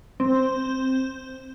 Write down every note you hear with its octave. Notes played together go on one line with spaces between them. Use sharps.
C4